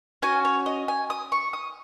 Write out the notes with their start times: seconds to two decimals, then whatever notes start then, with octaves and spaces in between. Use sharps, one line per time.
0.22 C#4 F#4 G#5
0.45 C#5
0.66 D#5
0.88 G#5
1.10 D#6
1.32 C#6
1.53 D#6